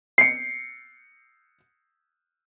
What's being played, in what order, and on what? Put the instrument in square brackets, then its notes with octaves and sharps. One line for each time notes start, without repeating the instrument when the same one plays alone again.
[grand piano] C7 C#7